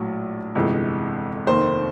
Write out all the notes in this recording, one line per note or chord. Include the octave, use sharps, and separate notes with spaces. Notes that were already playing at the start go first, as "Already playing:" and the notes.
Already playing: A#1 A2 F#3
G1 F2 C3 E3 G#3
F1 D#2 D#3 C5